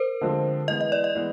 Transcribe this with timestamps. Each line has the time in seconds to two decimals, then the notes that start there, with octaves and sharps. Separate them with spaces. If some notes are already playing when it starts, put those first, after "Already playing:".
Already playing: A#4 C5
0.21 D3 F3 G#3 C4
0.68 E3 G#3 B3 D#5
0.81 D#5
0.92 D5
1.04 D#5
1.15 E3 G#3 B3